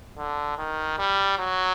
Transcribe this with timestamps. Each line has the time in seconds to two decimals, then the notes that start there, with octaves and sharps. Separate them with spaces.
0.18 D3
0.58 D#3
0.99 G3
1.39 F#3